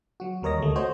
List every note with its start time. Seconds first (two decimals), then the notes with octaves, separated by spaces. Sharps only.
0.20 F#3 F#4
0.42 D#2 G3 A#4 C#5 D#5 A#6
0.60 D2 A3
0.76 A3 F#4 C5 C#5 D#5